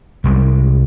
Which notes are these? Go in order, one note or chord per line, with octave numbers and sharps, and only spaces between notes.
C2 G3 G#3